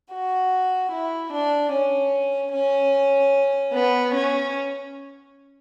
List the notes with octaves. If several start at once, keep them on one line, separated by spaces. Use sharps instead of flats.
F#4
E4
D4
C#4
C#4
B3
C#4